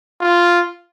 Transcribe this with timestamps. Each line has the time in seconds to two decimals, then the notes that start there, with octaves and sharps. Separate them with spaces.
0.21 F4